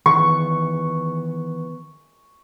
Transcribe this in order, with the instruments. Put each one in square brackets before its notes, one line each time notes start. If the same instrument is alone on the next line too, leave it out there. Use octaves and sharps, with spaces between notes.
[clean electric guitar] D#3 E3 B3 [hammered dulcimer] C#6